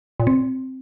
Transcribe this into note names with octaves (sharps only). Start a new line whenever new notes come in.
A#2
C4